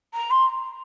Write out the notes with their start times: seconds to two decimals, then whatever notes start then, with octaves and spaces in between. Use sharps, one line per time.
0.13 A#5
0.30 C6